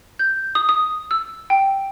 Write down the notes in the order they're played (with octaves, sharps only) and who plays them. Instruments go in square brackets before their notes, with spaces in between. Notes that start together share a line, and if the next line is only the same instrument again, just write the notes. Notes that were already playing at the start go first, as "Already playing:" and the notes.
[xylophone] G6
D#6
D#6
E6
G5